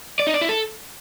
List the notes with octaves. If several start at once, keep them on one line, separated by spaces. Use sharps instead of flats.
D5
D#4
D5
E4
A4